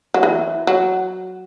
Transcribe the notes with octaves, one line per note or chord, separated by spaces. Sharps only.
F#3
E3
F#3